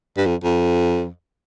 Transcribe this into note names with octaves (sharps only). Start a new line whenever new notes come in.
G2
F2
F2